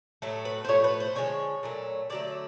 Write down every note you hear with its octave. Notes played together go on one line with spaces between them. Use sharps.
A2 F#3 A3
B4
C5
A2 F3 A3 C#5
B4
C5
D3 F3 G#3 C#5
A#2 F#3 A3
D3 F#3 A3 D5